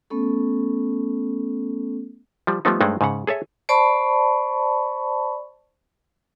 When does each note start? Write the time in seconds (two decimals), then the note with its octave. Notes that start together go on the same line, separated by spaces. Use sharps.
0.10 A3 B3 C#4 A4
2.47 F3 G3
2.65 F3 G3 A3 B3 D#4
2.81 G2 G#3 A3 D#4 C5 F#5
3.01 G#2 C#3 F#5
3.27 G#4 A4 C#5 E5
3.69 C5 D5 A5 B5 C#6